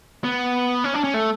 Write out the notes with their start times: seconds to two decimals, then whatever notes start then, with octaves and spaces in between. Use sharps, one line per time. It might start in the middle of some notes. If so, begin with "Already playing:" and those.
0.24 B3
0.84 C#4
0.94 D4
1.04 C#4
1.14 A3